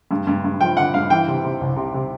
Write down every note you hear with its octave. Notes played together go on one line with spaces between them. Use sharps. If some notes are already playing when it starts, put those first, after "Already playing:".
G2
G2
G2
F3 G5
D3 F#5
G2 F5
E3 G5
C3
C3
C2
C3
C3